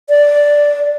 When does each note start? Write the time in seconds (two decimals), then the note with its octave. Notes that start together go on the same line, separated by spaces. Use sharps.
0.09 D5